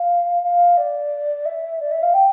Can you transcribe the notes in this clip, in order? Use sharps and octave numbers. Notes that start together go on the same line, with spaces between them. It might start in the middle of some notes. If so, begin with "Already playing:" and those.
Already playing: F5
F5
D5
E5
D5
E5
F5
G5